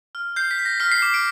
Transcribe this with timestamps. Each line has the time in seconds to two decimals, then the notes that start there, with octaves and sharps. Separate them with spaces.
0.15 F6
0.36 G6 C7
0.51 B6
0.59 G6
0.65 A#6
0.80 F6 B6
0.92 C7
1.02 D6 C7
1.14 D7